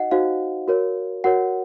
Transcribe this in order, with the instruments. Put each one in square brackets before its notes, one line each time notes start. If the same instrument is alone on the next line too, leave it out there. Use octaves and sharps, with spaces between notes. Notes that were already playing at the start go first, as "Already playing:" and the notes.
Already playing: [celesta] D#4 F#4 D#5 F#5
D#4 F#4 C5 F5
F#4 A#4 C#5
F#4 A#4 C#5 F#5